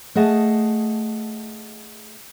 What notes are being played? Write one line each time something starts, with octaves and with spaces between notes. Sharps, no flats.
A3 G#4 D#5 F#5 A5